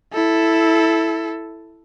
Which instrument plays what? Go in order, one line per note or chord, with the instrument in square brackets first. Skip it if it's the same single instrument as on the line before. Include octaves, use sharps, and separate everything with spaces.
[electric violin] E4 A4